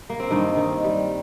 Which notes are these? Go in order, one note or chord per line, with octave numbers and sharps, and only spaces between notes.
A#3
C4
G2 D#3 D#4
D#3
G3